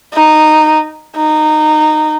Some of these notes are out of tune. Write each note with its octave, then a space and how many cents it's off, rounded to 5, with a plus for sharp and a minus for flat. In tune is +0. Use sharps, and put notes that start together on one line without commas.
D#4 -10
D#4 -20